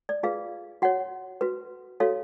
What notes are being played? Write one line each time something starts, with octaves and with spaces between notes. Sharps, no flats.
D5
F4 G#4 B4 F5
F#4 C#5 F#5
F#4 B4
F#4 A4 C#5 F5